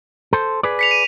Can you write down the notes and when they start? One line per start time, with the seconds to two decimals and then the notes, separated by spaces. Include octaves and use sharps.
0.33 A4 C5
0.63 G#4 B4 D5
0.79 B6 C#7 F7
0.91 D#7